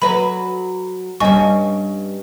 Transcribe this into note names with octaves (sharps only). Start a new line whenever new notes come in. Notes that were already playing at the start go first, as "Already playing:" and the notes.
F#3 B4 B5
G2 G3 C#4 D4 D#5 G#5 C#6